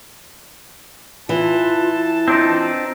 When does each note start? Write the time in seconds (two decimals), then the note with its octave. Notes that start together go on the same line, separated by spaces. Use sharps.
1.29 E3 F4 A5
2.28 C4 D4 D#4 F4